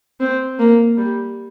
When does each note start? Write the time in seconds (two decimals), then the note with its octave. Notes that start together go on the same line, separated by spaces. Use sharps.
0.20 C4
0.59 A#3
0.97 G3